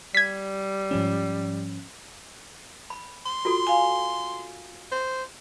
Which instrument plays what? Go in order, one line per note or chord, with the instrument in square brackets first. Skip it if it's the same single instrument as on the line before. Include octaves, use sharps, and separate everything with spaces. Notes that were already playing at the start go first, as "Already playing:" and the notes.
[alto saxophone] G3 [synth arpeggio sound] G#6 B6
[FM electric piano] G#2 F3 C#4
[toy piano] B5
[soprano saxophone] C6
[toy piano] F4 F#4 A4
[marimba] F5 G#5
[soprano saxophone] C5